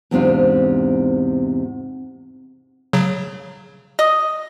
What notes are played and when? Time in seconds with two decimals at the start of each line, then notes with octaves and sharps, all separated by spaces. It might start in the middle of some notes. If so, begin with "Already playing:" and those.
0.11 E2 G#2 C3 C4 D4 F4
2.93 C#3 F#3
3.99 D#5